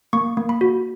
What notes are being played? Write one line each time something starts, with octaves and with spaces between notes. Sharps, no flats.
A#3 C#6
A#3
B5
F#4